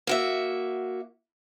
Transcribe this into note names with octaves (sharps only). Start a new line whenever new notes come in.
A#3 F#4 E5